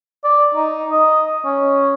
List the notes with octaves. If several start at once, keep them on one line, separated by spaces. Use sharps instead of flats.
D5
D#4
D#5
C#4